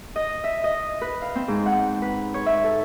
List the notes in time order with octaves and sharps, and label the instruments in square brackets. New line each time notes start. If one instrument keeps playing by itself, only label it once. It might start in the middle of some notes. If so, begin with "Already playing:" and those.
[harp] D#5
E5
D#5
B4
F5
C4
G#2
F#5
B4
C#5
E5
A4